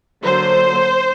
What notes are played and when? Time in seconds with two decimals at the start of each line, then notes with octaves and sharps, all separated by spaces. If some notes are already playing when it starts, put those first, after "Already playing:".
0.23 D3 F#3 A#3 C5